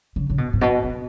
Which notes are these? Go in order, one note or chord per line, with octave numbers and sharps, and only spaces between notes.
C#3
C#3
B2
G#2
B2
B2